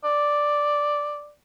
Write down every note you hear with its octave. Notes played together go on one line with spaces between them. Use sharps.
D5